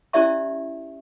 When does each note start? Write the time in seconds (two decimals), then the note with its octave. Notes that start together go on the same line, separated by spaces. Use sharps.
0.13 C#4 E4 G4 D5 E5 C#6